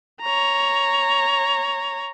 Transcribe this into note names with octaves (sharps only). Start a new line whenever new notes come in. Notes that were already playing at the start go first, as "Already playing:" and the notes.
C#5 A#5